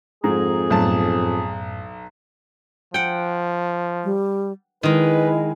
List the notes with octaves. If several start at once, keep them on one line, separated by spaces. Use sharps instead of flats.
F2 G#2 G#4 A#5
B1 F#2 A2 A5
F3 F#5 G5
G3
D#3 G#3 E4 B4